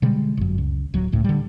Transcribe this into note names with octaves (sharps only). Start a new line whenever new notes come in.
B2 D3 G3 G#3
G1 F#2
C#2
D1 F#3
G1 C#2 A2
D3 G3